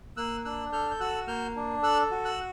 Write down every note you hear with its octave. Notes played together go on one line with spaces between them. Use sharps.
A#3 E6 F#6
D4 E6 F#6
A4 F6 G6
G6
F#4 E6 F#6
A#3 F6 G6
D4
A4 E6 F#6
F#4
E6 F#6